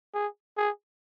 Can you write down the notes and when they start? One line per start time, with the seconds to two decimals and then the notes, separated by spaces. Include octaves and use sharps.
0.14 G#4
0.57 G#4